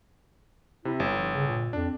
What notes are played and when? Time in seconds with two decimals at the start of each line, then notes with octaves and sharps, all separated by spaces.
0.85 C3 E4
1.00 G1
1.18 F3
1.33 C#3
1.48 A#2
1.73 F2 D4